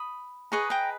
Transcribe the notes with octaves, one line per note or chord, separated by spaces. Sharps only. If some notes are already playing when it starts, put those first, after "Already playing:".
Already playing: B5 D#6
G#4 B4 D#5 A#5 C#6
G5 A#5